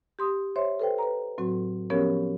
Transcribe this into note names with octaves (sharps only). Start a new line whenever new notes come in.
G4 C6 D#6
C5 C#5 E5 C6
A4 B4 C5 G5
B4 A#5
A2 F#3 C4 F#4
F3 B3 C#4 G4 A#4 C#5